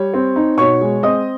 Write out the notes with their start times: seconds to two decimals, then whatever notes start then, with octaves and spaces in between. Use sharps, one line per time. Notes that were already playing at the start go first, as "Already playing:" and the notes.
Already playing: G3 C#5
0.14 C4
0.36 D#4
0.58 B2 C#5 C#6
0.81 G#3
1.03 C4 D#5 D#6